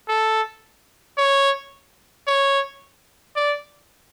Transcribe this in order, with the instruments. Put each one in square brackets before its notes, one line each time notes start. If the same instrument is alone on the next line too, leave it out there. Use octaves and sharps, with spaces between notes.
[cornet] A4
C#5
C#5
D5